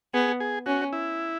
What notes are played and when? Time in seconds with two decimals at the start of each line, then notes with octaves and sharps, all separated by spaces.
0.14 B3 G#4
0.40 G#4
0.66 C#4 F#4
0.93 E4